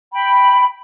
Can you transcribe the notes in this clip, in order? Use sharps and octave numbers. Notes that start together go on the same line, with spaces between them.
G5 B5